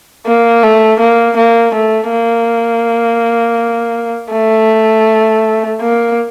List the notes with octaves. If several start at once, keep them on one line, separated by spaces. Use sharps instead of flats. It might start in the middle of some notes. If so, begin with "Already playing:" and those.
A#3
A3
A#3
A#3
A3
A#3
A3
A#3